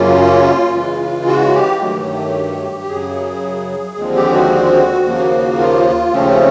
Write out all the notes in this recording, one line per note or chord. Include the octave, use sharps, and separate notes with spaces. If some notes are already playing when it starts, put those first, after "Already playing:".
Already playing: F#2 C#3 F#3 A#3 C#4 F4
C#3 E3 G#3
F#4
G4
G2 D#3 F#3 A3
F#2 C#3 F#3 G#4
D#2 D3 F3 G#3 C4
G4
F#4
D#2 C#3 F3 A#3
F4
D#2 C#3 F3 A3 C4 C#4